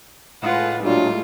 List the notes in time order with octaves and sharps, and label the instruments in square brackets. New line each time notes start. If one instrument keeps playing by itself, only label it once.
[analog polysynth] A2 G#3 [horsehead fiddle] F4 B4 [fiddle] F#5
[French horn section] A#2 F#3 D4 [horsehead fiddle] G3 A3 [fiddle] F4